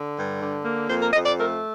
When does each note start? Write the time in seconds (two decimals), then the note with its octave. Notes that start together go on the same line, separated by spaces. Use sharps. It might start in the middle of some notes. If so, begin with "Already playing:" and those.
Already playing: D3
0.16 G2
0.41 D3
0.64 A#3
0.89 F2 C5
1.02 A#4
1.13 F2 D#5
1.26 D5
1.38 A3 A#4